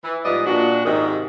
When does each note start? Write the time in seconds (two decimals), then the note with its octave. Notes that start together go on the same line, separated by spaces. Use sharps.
0.04 E3
0.25 G#2 F3 G3 B3 D5 D#5
0.46 A#2 D4 F#4
0.86 G#2 C3 D#3